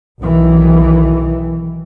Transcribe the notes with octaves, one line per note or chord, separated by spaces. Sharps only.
B1 D#3 E3